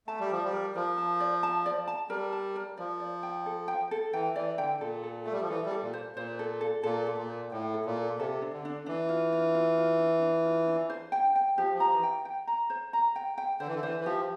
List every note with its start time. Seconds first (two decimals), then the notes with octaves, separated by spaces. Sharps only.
0.07 A3 A5
0.20 G3
0.29 F3 A5
0.45 G3
0.52 A#4
0.76 F3 A#4
0.98 A5
1.20 D5
1.43 A5
1.66 D5
1.88 A5
2.10 G3 A#4
2.33 A5
2.56 A#4
2.78 F3 D5
3.00 D5
3.23 G5
3.46 A4
3.68 G5
3.91 A4
4.13 E3 G5
4.36 E3 D5
4.58 D3 G5
4.81 A#2 A4
5.03 A4
5.25 A3 A4
5.33 G3
5.41 F3
5.49 E3 A4
5.65 G3
5.71 A4
5.82 A#2
5.93 C5
6.16 A#2 C5
6.39 A4
6.61 A4
6.83 A#2 A4
7.06 A4
7.17 A#2
7.29 C5
7.52 A2 G5
7.74 A4
7.85 A#2
7.97 A4
8.19 C3 A4
8.42 D4
8.53 D3
8.65 D4
8.86 E3 D4
9.09 F4
9.33 F4
9.55 F4
9.78 F4
9.99 D4
10.22 D4
10.45 F4
10.68 D4
10.90 C5
11.12 G5
11.35 G5
11.57 F3 G4
11.75 F3
11.80 A#5
11.91 E3
12.03 G5
12.25 G5
12.47 A#5
12.70 C5
12.93 A#5
13.16 G5
13.38 G5
13.60 D3 C5
13.68 E3
13.75 D3
13.83 E3 C5
14.00 E3
14.05 F3 G4